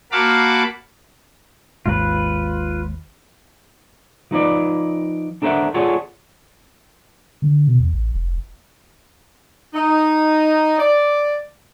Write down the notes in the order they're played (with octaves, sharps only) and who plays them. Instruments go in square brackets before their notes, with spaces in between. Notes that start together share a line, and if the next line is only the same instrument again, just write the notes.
[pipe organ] A#3 F#4 F5 A5 B5 D6
[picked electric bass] G#1 D#2 G#2 [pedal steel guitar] F4 B4
[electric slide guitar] F3 D#4 B4 D5
D4 A4 A#4 C5 E5 F#5
F4 G#4 A4 C#5 D5 F#5
[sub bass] D3
B2
E2
A1
F1
[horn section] D#4
D5